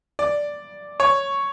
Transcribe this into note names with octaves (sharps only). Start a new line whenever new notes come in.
D5
C#5